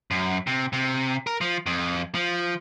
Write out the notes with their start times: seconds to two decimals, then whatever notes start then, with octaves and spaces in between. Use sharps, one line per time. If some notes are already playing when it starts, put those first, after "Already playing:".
0.11 F#2
0.47 C3
0.73 C3
1.27 A#4
1.41 F3
1.66 F2
2.15 F3